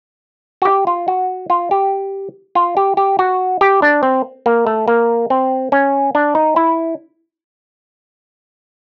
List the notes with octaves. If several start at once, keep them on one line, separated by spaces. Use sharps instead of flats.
F#4
G4
F4
F#4
F4
G4
F4
G4
G4
F#4
G4
D4
C4
A#3
A3
A#3
C4
C#4
D4
D#4
E4